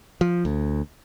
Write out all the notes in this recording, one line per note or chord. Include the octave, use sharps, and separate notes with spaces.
F3
D2